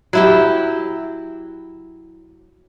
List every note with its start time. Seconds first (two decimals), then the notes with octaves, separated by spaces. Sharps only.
0.13 F#3 E4 G4